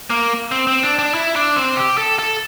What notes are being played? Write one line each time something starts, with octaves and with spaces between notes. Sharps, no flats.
A#3
C4
C4
D4
D4
E4
D4
C4
G4
A4
A4